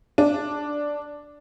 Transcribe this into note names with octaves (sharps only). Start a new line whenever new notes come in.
D4